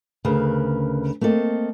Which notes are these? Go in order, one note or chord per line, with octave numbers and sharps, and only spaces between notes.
D2 C#3 A#4 B4
A3 A#3 C4 A4 D#5